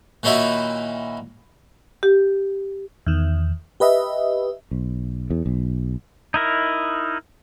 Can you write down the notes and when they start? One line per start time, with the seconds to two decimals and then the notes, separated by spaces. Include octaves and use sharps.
0.23 A#2 D#3 C#4 D#4 E4 F#4
2.03 G4
3.06 E2 D#3
3.80 G4 B4 D#5 E5
4.71 B1
5.30 E2
5.46 B1
6.34 D#4 E4 A#4